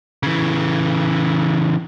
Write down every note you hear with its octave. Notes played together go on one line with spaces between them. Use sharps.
C#3 E3